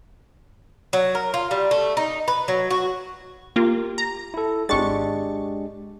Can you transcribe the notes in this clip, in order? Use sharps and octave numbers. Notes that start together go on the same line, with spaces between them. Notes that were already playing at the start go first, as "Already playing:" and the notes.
F#3
A#4
F4
G3
A3
D#4
B4
F#3
F#4
A#3 F4 G4
A#5
E4 A4
G#1 G#3 D4 G4 C#6 A6